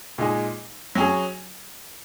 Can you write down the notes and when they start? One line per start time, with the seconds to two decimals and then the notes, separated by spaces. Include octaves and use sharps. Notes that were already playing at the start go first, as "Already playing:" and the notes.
0.18 A#2 G#3 D#4 G#4
0.95 F#3 C#4 G#4